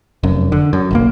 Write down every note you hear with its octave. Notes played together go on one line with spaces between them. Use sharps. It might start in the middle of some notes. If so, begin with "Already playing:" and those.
F1 F#2
D3
F#2
F#1 B1 A#3